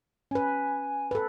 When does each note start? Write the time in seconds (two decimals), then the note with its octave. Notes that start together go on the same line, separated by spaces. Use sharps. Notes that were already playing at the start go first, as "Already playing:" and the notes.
0.31 C#4 B4 G#5
1.11 A4 B4